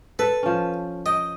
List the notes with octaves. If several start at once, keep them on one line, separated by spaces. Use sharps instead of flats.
A4 B4
F3 C#4
D#5 G5